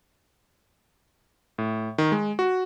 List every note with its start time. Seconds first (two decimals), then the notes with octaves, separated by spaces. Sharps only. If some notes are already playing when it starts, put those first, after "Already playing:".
1.58 A2
1.98 D#3
2.12 G#3
2.39 F#4